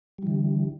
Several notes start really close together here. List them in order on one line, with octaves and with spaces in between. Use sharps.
G3 E3 D3